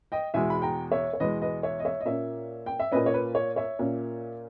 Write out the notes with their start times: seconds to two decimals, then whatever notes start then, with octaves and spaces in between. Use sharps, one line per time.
0.12 D#5 G5
0.34 E2 B2 G#3 E5 G#5
0.50 B5
0.62 G5 A#5
0.92 C#5 E5
1.13 C#5
1.20 E2 B2 G#3 B4 D#5
1.42 B4 D#5
1.63 C#5 E5
1.80 D#5
1.85 C#5 E5
2.01 D#5
2.05 A#2 A#3 C#4 C#5 E5
2.66 G5
2.80 E5
2.92 A#2 A#3 C#4 B4 D#5
3.06 C#5
3.14 B4
3.35 C#5
3.56 C#5 E5
3.79 A#2 A#3 C#4